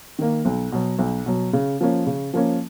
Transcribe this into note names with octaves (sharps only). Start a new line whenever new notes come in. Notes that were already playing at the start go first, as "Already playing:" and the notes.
D#3 A#3
B1
B2 F#3
B1
B2 F#3
C#3
F3 A#3 C#4
C#3
F3 A#3 C#4